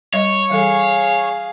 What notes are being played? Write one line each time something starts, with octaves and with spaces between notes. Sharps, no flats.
G3 C#5 D#5
E3 G3 G#4 A4 F5